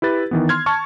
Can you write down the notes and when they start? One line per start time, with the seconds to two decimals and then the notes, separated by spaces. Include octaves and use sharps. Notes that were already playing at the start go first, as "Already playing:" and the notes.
0.02 E4 G4 B4 A6
0.31 D#3 E3 B3
0.49 C6 F6 G#6
0.66 A5 C#6 F6